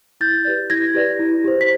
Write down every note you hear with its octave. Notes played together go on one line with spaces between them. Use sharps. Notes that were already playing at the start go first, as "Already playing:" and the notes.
E4 G6 A6
G4 B4 D5
E4 G#6 A#6
G4 B4 D5
E4
G4 C5
B6